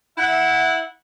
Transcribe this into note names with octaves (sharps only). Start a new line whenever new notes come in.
E4 E5 F#5